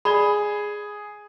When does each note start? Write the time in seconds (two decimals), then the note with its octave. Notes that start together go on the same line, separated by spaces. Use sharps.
0.05 G#4 D5 B5